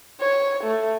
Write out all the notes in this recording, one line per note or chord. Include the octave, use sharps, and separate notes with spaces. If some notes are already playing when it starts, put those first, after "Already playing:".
C#5
A3